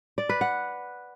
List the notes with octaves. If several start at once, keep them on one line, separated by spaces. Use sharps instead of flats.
D5
B4
F#5